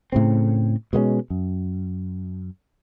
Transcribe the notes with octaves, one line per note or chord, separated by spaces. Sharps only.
A2 C#3 C4
B2 G#3 A#3 C#4
F#2